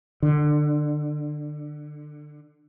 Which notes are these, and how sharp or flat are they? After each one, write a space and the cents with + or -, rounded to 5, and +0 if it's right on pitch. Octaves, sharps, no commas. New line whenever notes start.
D3 +20